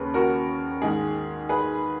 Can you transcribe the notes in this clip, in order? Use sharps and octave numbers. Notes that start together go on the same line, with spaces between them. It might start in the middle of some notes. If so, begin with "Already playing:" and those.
Already playing: D#2 C#3 B4
F#4 A#4
G#2 D#3 G#3 G#4
G#4 B4